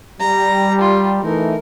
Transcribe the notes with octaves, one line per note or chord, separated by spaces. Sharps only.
G3 A#5
F4
E3 A3 D#4 A#4